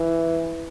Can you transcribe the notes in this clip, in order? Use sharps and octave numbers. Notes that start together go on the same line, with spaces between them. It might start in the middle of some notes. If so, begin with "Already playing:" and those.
Already playing: E3